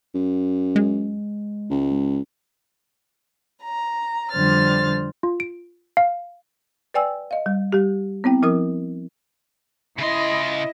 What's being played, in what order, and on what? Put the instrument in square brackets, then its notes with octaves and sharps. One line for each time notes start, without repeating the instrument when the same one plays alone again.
[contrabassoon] F#2
[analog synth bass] G#3
[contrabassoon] C#2
[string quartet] A#5
F2 D3 G3 C5 F6 A6
[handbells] F4
D7
F5
[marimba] B4 D5 G5 G#5 E6
D#5 F5
G3
G3 G4
B3 C4 E4 G5
F3 E4 A#4 D#6
[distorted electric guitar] C#3 C6 [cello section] E4 D#5